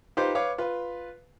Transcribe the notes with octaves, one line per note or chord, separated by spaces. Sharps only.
D#4 F4 G4 B4 C5
B4 C#5 F5 D6
F4 B4